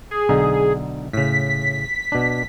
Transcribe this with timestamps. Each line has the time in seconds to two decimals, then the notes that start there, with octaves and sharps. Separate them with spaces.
0.11 G#4
0.29 B1 D3 D#4
1.13 A2 C#3 B6
2.12 B2 D4